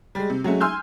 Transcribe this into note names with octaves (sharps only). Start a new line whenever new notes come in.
G3 G#3
C3
F#3 G#3 A3 C#4
G#5 C6 E6 F6 G6